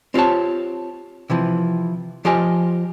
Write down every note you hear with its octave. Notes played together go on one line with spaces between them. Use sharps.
C4 F4 G4 C#5 A5
C3 E3 F3
F3 F4 G4 D#5 G#5